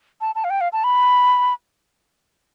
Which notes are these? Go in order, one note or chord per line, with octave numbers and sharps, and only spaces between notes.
A5
A5
F5
G5
F5
A5
B5